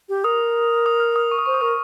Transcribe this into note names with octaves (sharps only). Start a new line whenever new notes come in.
G4
A#4 D#6
D#6
F6
D#6
C#6
D#6
C5 C#6
D#6
A#4 C#6
D#6